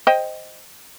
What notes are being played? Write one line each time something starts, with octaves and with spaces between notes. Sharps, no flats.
C5 D#5 G5